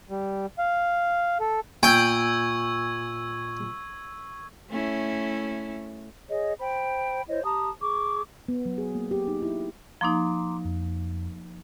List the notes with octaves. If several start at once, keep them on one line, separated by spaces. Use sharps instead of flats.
G3
F5
A4
A#2 G5 C#6 E6 G#6
A3 C#4 E4
G#4 C#5 D#5
C5 G5 B5
E4 C5 C#5 D#5
G4 A5 A#5 D#6
G#4 C#6 D6
B3
F#3
G#4
A#3
G4
D#4
E4
F3 A#3 D#4 A#5 C6 D6
F2